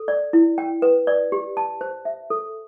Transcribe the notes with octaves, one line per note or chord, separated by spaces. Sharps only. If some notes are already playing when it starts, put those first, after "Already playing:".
Already playing: A4
D5
E4
G5
B4
D5
G4
A5
C5
E5
A4